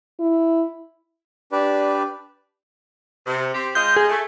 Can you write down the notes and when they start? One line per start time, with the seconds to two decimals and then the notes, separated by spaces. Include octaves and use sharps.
0.20 E4
1.52 D4 G4 B4 D5
3.27 C3
3.54 C4 G4
3.75 G#3 F4 D#5 G6
3.97 G#4
4.10 A3